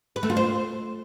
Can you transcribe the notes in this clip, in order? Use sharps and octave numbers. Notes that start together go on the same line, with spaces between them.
B4
A3
F4
C5